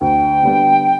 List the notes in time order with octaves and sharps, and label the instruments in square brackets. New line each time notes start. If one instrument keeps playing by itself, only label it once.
[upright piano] D2 [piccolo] G5
[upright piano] D3 G3 B3